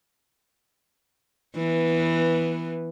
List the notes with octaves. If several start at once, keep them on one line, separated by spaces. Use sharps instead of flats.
E3 B3